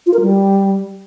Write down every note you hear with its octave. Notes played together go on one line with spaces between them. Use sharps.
F4
A#4
G3